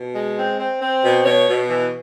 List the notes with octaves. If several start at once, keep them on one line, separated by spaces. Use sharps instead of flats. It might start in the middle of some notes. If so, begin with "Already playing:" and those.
Already playing: B2
G#3
C4
C4
C4
B2
B2 C#5
B2
E3